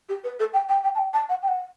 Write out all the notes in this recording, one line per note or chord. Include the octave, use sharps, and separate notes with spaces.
G4
B4
A4
G5
G5
G5
A5
G5
A5
F#5
G5
F#5